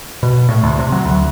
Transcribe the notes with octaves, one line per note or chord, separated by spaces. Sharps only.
B2
A2
D2
C3
F#3
D2